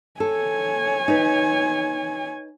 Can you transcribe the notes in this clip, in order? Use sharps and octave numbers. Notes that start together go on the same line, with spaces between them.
A4 C#5 G#5
D#4 B4